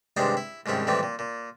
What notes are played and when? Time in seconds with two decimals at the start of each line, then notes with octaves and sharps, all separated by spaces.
0.17 G2 C3 D#3 G#3 D4 C5
0.37 E4
0.66 C2 G#2 D#3 C#4 E4
0.87 A2 D#3 E3 G3 C4
1.03 A#2
1.19 A#2